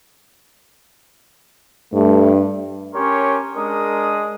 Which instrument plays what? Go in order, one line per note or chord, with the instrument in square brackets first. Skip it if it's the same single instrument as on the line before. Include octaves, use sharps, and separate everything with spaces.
[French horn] G2 [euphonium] A3
[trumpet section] C#4 G4 A#4 C#5 C6
G#3 D4 A#4 D#6